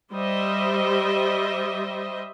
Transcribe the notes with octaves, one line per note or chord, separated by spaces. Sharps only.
G3 C5 D#5 E5